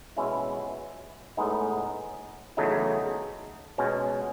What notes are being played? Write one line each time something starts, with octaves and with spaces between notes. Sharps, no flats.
B2 G#3 C#4 E4
A2 G#3 B3 D#4
E2 C#3 F#3 A3 D#4
B2 G#3 C#4